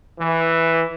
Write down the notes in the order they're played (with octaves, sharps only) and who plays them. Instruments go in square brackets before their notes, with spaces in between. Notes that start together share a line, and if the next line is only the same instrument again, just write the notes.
[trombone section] E3